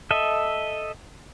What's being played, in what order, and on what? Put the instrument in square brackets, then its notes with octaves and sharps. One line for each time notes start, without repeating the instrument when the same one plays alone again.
[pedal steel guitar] A4 D#5 E5